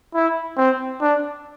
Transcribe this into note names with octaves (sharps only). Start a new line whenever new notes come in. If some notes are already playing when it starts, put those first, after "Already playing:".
E4
C4
D4